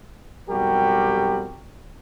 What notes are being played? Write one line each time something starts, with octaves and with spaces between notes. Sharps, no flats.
B1 F2 G3 F#4 G4 A#4